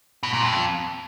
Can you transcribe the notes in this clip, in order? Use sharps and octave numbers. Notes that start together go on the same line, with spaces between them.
B2
A#2
F2